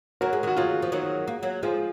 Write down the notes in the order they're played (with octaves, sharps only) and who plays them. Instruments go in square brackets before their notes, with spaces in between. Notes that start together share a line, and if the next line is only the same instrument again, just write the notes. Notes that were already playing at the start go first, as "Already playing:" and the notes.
[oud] F#3 [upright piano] F#4 A#4
[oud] G#3
[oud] D#3 F#3 [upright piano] F#4
[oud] D#3 F#3 [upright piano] F4 G#4
[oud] F3
D#3 F#3
A#3
F#3 A#3
[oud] F3 G#3 [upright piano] F4 G#4